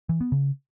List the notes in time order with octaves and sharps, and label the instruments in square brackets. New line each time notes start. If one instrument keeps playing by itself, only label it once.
[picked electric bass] E3
B3
C#3